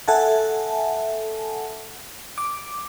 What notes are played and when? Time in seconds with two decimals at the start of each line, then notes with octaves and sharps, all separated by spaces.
0.08 A4 E5 F#5 G#5 A5
2.38 D6